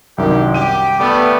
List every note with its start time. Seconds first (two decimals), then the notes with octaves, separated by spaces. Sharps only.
0.18 C2 F#2 D#3 G4
0.54 G4 D#7
0.99 D3 G3 A3 B3